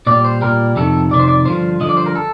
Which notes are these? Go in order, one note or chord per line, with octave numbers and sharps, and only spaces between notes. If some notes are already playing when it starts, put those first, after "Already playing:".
A#2 G3 D5
C5
A#2 G3 A#4
F2 C3 D#3 A4
F2 C3 D#3 D5
C5
D5
G2 D3 F3 C5
G2 D3 F3 D#5
D5
C5
A#4
A4